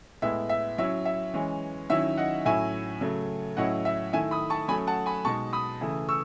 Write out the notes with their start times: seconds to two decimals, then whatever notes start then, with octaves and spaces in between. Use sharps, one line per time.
0.22 A2 G#3 B3 E4 E5
0.49 E5
0.78 F#3 C#4 E4 E5
1.05 E5
1.34 E3 G#3 C#4
1.90 D#3 F#3 C#4 E4 E5
2.17 D#5 F#5
2.45 A2 F#3 C#4 E4 E5 G#5
3.01 C#3 F#3 A3
3.57 A2 F#3 C#4 E4 D#5 F#5
3.85 E5
4.13 D#3 A3 E4 E5 G#5
4.31 B5 D#6
4.50 A5 C#6
4.68 F#3 A3 C#4 G#5 B5
4.87 F#5 A5
5.06 G#5 B5
5.25 B2 G#3 D#4 A5 C#6
5.53 B5 D#6
5.81 C#3 E3 A3 E4
6.08 C#6 E6